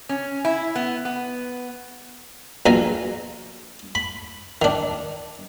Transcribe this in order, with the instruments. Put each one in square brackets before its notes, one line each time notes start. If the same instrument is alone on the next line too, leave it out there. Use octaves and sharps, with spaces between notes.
[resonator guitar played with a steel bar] C#4
E4
B3
B3
[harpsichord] A#1 B2 G#5 A#5
B5
D#3 D4